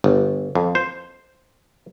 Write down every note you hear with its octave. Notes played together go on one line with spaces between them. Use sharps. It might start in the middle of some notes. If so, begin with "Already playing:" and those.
G1
F2
C5